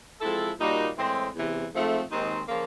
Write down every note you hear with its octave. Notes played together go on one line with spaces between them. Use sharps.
F3 G#3 C4 E4 A4
A#2 G3 A#3 D#4 F#4
A2 E3 G#3 C4
E2 C3 E3
G#2 F3 A3 C4
D#2 D#3 G#3 C4 D#4
C#3 F3 A#3